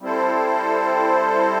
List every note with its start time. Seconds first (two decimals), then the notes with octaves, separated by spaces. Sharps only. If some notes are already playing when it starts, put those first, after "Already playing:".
0.01 G3 C4 E4 A4 C5